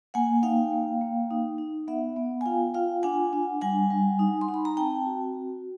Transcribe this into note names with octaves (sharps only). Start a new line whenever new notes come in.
A#3 F#5 G#5
D#4 F5 G5
A#3
A#3
D#4
D#4
B3 E5 F#5
B3
G#5
F4 F5 G5
F4 F5 G5
D4 F#5 G#5
D4
G3 F#5 G#5
G3
D#4
C6
D#4
B5
A#5
C4 G5 A5
F#4